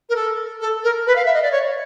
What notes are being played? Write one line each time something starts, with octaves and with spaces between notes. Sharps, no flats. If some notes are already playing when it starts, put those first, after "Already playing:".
A#4
A4
A4
A#4
B4
F5
E5
D#5
D5
C#5